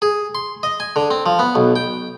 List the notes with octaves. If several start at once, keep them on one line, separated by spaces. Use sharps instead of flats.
G#4
C6
D#5
G#5
D3
C4
F3
B3
B1
G5